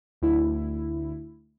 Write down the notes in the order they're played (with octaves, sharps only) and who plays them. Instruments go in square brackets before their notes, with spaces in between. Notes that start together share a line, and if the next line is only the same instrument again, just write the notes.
[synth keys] D2 E4